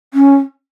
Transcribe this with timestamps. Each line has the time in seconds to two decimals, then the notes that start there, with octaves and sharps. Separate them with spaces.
0.14 C#4